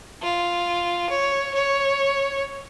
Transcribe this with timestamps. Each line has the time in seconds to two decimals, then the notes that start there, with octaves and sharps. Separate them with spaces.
0.23 F4
1.10 C#5
1.54 C#5